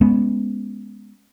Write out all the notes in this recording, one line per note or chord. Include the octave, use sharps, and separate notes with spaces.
G#3 B3 C#4